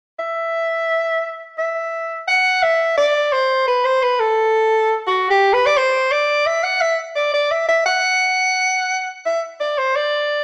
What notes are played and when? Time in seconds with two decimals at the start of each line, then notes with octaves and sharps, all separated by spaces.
0.19 E5
1.58 E5
2.28 F#5
2.62 E5
2.97 D5
3.32 C5
3.67 B4
3.85 C5
4.02 B4
4.19 A4
5.07 F#4
5.30 G4
5.53 B4
5.66 D5
5.77 C5
6.11 D5
6.46 E5
6.63 F#5
6.81 E5
7.15 D5
7.33 D5
7.51 E5
7.68 E5
7.86 F#5
9.25 E5
9.60 D5
9.78 C5
9.95 D5